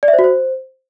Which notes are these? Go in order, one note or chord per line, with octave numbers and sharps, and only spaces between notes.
D5
E5
C5
F#4
C5